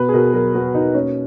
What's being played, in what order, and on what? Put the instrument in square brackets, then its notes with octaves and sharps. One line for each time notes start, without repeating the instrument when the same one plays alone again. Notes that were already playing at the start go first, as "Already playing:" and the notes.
Already playing: [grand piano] B2 B3 B4
G#4
B2 A#4
F#3 A#4
B3 F#4
B2 D#4
A#3 C#4